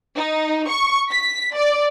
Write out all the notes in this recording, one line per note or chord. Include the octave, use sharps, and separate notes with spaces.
D#4
C#6
B6
D5